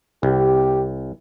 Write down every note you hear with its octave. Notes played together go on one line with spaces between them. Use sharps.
C2 G4